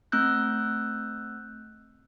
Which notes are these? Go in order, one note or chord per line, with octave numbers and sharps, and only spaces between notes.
A3 C4 E6 F#6 G6